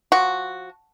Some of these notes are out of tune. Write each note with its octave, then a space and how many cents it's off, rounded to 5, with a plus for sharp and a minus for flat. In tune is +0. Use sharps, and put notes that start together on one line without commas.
F3 +15 F#4 +0